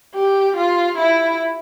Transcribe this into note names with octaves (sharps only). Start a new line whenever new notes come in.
G4
F4
E4